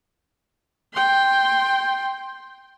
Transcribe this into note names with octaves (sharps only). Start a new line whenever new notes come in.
G5 C6